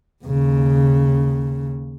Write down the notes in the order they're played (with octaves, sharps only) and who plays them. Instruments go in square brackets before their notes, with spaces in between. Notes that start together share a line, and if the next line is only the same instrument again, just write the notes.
[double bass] D#2 C#3